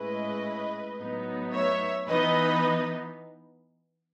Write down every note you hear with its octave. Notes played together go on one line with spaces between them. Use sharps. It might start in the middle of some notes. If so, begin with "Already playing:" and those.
Already playing: A2 G#3 C#4 E4 B4 D#5
A2 F#3 B3 D#4
C#5 E5
E3 B3 D#4 B4 D#5